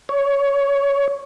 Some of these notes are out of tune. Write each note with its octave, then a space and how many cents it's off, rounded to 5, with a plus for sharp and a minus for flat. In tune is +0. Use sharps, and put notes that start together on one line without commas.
C#5 +15